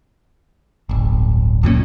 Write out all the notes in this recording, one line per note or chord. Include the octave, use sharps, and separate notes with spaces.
D1 G1
C#2 F#2 A#2 C#4